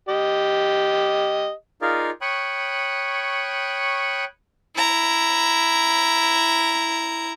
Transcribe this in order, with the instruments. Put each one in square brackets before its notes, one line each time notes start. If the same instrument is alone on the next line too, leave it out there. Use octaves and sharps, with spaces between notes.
[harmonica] G4 D#5
[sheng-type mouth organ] D#4 F4 G#4 A#4 D5 F5
C#5 G5 B5 C#6 D#6 F#6
[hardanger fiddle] E4 A#5